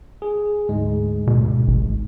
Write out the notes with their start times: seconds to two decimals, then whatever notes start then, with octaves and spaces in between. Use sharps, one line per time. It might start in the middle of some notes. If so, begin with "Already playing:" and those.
0.22 G#4
0.69 D2 G#2 G#3
1.27 B2
1.68 A1